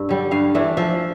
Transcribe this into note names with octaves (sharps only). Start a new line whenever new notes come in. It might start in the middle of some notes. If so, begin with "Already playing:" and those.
Already playing: G2
D3 G3
G2 F5
E3 A3 D4
F3 E5